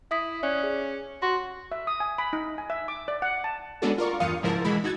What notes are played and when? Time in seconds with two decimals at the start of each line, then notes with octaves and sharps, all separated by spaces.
0.11 E4 E5 D#6 B6
0.43 C#4 D5 F#6
0.63 G#4
1.22 F#4 C6
1.72 E5
1.87 D#6
2.00 G#5
2.18 B5
2.33 D#4
2.58 G#5
2.70 E5
2.88 D6
3.08 D5
3.22 F#5
3.44 A5
3.82 G#3 B3 C#4 D4 F#4 A4
3.98 F4 A#4 D5 C#6
4.20 E2 G2 F4 F5 D#6 C#7
4.43 C#2 G#2 F3 E4 A#4 A5
4.64 B2 E3 G#3 E4 B5
4.84 D#4 F#4 G#6 A6